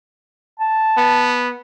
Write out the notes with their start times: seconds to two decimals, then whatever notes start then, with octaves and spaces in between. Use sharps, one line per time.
0.60 A5
0.97 B3